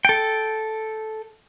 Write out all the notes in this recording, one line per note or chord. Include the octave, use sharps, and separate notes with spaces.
A4 G5